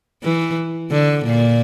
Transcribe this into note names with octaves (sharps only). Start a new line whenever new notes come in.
E3
D3
A#2